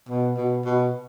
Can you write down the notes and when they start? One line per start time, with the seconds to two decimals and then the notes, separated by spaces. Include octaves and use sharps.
0.09 B2
0.37 B2
0.65 B2